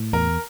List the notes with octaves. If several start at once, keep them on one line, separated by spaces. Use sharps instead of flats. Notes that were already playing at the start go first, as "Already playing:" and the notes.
Already playing: A2
E2 A#4